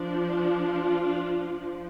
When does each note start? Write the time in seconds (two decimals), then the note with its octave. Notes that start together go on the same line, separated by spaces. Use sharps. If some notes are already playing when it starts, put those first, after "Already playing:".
Already playing: F3 D4
0.31 F4
0.67 F4
1.05 F3 D4
1.41 D4